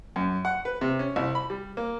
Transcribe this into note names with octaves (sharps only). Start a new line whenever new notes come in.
F#2
F#5
B4
C3
C#4
C2
B5
G3
A#3